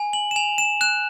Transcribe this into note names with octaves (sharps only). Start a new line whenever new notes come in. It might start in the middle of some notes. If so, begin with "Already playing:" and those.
Already playing: G#5
F#7
E7
G#5 F7
E7
F#6 E7